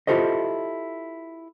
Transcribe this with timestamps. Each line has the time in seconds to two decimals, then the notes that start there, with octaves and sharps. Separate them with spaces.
0.07 E4 F4 G4 A4 C5 D#5